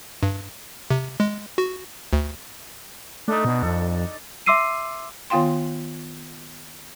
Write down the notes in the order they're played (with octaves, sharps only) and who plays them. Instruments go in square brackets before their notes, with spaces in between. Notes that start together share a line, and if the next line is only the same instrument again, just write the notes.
[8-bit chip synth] G2
C3
G#3
F#4
D2
[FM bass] A3 [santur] D4 D#4
[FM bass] B2
[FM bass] F2 [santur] A4
[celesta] E5 C6 D6 E6 C7 D#7
[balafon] D#3 B3 F4 F5 G5 C6